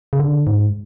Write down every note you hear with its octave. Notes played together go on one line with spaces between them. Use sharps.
C#3
D3
G#2